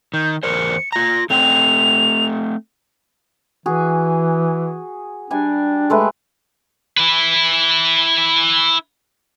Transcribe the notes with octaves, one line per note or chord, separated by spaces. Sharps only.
D#3 G6
E2 A#4 C5 C#7
F4 A#5 A#6
A3 C4 G5 F7
E3 F#4 G#4
G3 D4 G#5
G#3 A3 B4
E4 B4